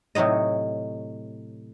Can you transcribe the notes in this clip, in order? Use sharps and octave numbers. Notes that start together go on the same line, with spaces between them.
A2 C3 F#3 C#5 D#5